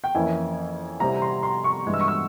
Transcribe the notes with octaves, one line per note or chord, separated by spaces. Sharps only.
G5
F2 E3 A#3 C#4 E4 G#5
C3 G3 C4 E4 G4 A#5
C6
C6
C#6
G2 E3 G#3 E4
E6
C#6
E6